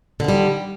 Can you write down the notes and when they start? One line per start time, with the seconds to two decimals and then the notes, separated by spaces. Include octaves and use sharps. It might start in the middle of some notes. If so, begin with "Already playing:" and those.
0.20 D3
0.24 D#3
0.28 G3